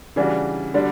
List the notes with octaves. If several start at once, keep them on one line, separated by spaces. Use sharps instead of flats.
C#3 E3 G3 D4 F#4
D3 G3 D4 F#4